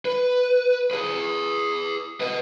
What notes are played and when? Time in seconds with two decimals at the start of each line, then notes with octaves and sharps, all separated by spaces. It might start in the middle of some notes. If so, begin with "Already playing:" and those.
0.05 B4
0.91 G#4 B4
2.21 B4 D#5